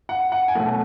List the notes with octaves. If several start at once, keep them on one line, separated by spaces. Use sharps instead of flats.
F#5
F#5
G#5
B2 F#3 A3 F#5